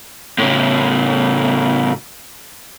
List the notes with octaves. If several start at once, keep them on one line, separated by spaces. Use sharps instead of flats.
A2 C#3